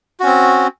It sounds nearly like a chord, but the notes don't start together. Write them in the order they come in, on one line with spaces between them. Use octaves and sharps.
F#4 C#4 C4